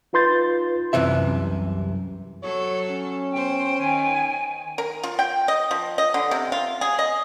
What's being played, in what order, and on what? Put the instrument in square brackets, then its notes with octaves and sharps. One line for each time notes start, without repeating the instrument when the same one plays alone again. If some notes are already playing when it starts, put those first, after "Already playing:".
[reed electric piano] D#4 F4 B4 C6 G6 A6
[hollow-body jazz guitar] C2 F#2 C3 E3 E5
[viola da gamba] F#3 A4 [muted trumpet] C#5
[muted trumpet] C#4
[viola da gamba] B3 C5 [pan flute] G5
[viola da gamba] D#3 [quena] G#5
[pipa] A#4
F4
G5
D#5
F3
D#5
D3
C3
F4
G#4
D#5